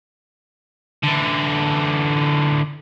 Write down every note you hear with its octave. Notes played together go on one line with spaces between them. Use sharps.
D3 E3